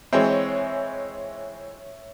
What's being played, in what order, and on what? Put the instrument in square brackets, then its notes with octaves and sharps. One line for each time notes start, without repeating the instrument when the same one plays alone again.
[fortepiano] E3 G#3 C4 [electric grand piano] C#5 E5